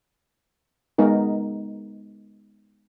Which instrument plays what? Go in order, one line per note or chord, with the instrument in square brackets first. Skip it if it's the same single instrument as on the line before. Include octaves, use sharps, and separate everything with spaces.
[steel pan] G#3 B3 D#4 A#4